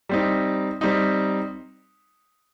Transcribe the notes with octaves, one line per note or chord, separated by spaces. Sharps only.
G3 C4 D#4
G3 C4 D#4